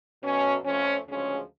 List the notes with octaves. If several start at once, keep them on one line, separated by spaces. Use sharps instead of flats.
B2 F#3 A3 C#4
F2 F3 A3 C#4
D2 C#3 F3 G#3 C#4